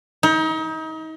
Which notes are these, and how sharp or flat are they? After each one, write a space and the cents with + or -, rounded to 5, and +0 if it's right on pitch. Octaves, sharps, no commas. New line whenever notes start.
D#4 +35